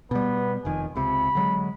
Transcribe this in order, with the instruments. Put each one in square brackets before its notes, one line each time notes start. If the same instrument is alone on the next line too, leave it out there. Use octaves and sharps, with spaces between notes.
[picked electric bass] B2 G3 [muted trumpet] B3
[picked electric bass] F1 F2 D#3 [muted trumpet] G#5
[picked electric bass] C#2 C3 [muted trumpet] B5
[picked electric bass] D3 F#3 G#3